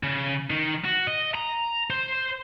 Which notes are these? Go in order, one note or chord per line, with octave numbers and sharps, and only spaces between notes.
C#3
D#3
F#4
D#5
A#5
C5